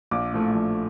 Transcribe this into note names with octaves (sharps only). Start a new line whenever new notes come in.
A#1 D6
A2 F3 A3
A#1